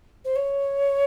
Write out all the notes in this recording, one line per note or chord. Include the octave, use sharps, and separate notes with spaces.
C5
C#5